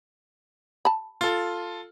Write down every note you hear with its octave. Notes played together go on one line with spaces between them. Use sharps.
A5 B5
F4 A4